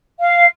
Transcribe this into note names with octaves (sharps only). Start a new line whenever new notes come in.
F5